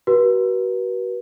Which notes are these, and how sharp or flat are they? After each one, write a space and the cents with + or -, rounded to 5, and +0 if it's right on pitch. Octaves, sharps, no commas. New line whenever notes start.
F#4 +35 B4 -40